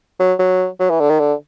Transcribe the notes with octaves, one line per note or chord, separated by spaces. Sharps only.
F#3
F#3
F#3
E3
D3
D#3
D3